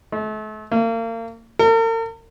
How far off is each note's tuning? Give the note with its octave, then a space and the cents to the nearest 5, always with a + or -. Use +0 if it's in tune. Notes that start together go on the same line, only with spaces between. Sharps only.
A3 -40
A#3 -35
A#4 -45